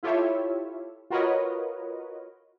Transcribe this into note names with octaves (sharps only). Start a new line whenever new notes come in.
E4 F4 G4 A4 C#5 E5
F4 F#4 A#4 B4 C#5 D#5